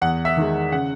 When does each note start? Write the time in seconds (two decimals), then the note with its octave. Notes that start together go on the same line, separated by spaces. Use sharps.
0.02 E2 F#5
0.25 E5
0.37 D#3 G#3
0.72 C#3 F#5